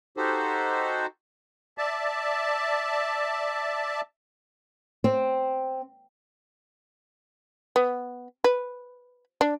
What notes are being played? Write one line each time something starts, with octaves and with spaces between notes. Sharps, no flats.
D#4 F#4 G4 A4 C5
D5 E5 A5
C4
B3
B4
D4